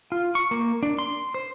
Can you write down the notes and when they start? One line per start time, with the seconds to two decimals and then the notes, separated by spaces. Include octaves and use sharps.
0.12 F4
0.35 C#6
0.51 A#3
0.83 D4
0.99 C6
1.34 C5